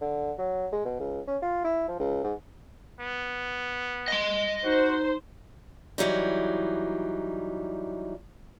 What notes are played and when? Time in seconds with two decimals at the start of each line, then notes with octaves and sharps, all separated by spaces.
0.01 D3
0.38 F#3
0.72 G#3
0.85 B2
1.00 C#2
1.28 C#4
1.42 F4
1.64 E4
1.88 F3
1.99 C#2
2.24 G#2
3.00 B3
4.08 D#5 C6
4.65 D#4 F#4 C5
5.98 E3 F#3 G3 D#4